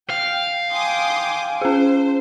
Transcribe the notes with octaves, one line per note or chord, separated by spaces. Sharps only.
F5 G5
G5 G#5 C6 D6 D#6
C#4 G#4 C5